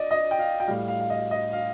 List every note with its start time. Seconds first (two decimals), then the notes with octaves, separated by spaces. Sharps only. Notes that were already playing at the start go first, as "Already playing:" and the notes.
Already playing: D5 D#5
0.11 D#5
0.31 G5
0.39 F5
0.60 G5
0.67 A2 G3 F5
0.88 F5
1.00 F5
1.10 D#5
1.31 D#5
1.53 F5